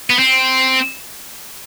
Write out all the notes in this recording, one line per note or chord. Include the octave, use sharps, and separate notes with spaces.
B3
C4